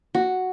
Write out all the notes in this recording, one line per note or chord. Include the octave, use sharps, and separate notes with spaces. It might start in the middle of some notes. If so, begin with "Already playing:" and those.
F#4